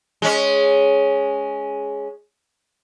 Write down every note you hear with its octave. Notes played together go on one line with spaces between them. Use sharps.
G#3 C#4